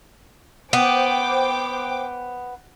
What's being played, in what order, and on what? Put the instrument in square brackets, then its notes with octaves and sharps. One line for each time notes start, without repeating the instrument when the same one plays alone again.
[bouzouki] B3 [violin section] C5 G5 D6